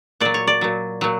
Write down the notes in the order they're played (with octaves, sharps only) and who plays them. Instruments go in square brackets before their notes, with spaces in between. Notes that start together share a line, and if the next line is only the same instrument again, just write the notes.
[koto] A#2 F#3 D5
C#5
D5
A#2 F#3
A#2 F#3